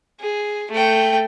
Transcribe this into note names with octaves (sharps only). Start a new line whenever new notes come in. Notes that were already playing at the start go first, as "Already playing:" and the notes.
G#4
A3 G5